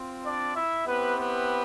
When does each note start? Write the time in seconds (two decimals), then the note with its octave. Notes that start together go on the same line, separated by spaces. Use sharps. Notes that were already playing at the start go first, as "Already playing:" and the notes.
Already playing: C4 F4
0.24 D4 D5
0.55 E4 E5
0.86 B3 C4 E4 G4 B4
1.17 B3 B4